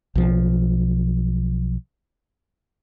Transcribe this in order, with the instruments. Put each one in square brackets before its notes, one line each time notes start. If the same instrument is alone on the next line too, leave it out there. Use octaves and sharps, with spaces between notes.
[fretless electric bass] B1 F3